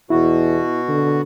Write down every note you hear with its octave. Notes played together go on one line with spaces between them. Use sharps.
E2 B2 E4 F#4
D3